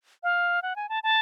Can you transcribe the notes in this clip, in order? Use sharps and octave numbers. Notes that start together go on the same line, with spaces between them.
F5
F#5
G#5
A5
A5